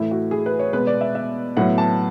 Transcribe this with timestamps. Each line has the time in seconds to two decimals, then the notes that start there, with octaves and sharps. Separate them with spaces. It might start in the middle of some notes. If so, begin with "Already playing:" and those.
Already playing: A2 E3 A3 E4
0.11 F#4
0.31 G#4
0.46 B4
0.59 C#5
0.73 B2 G#3 B3 B4
0.87 D5
1.01 E5
1.15 E5
1.57 A2 F#3 B3 F#5
1.78 A5